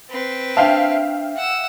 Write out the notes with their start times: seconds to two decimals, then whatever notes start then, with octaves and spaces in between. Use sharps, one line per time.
0.10 C4 B4
0.57 D4 C5 E5 F5 G5 A5
1.36 F#5 E6